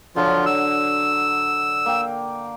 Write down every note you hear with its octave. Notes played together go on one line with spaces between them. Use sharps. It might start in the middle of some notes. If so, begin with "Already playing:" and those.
D3 F3 F#3 F4
E6
A#3 G5